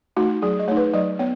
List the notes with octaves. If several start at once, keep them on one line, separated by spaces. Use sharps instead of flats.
A3 D#4 F#4
F#3 G#4
D#5
A3 D#4 C#5
B4
F#3 D#5
B3 C#5